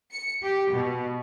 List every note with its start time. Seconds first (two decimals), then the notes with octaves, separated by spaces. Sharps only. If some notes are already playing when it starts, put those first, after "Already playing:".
0.11 C#7
0.43 G4
0.73 B2